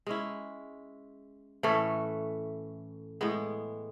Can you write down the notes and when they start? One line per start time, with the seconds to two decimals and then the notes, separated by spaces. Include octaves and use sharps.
0.07 G#3 C#4 E4
1.63 A2 E3 A3 C#4
3.21 A2 G#3 B3